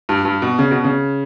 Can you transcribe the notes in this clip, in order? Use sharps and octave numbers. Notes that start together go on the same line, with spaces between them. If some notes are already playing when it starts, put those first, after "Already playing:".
G2
G2
B2
C#3
B2
C#3